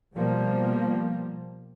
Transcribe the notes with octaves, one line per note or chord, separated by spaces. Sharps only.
B2 F3 G3 A#3